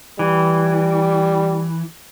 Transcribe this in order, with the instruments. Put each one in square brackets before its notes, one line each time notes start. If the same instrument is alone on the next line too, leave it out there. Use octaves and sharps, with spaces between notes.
[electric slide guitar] E3 [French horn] G3